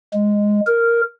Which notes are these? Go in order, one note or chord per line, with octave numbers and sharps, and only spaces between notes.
G#3
A#4